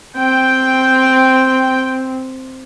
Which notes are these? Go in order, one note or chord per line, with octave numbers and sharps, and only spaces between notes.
C4 G5